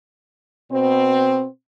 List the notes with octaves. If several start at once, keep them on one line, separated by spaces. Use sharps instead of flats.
B2 C4